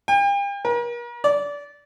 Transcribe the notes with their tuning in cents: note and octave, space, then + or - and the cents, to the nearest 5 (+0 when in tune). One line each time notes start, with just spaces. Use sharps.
G5 +40
A#4 +40
D5 -25